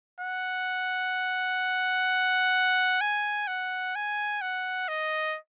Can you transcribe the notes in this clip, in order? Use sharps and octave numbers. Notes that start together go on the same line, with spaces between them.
F#5
G#5
F#5
G#5
F#5
D#5